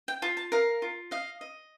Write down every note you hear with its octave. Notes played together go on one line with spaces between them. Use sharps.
G5
F4 A5
A5
A#4 F5
F4
D#5 F5
D#5